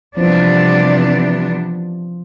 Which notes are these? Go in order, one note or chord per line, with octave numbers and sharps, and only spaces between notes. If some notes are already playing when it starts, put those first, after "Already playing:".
C3 E3 F3 G3 B3 D4